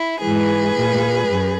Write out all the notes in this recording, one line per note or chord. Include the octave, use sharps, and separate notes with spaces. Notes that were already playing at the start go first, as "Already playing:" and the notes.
Already playing: E4
G#2 E3 G#4 B4
A#2
F#2